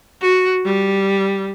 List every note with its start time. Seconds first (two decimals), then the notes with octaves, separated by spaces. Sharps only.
0.22 F#4
0.65 G3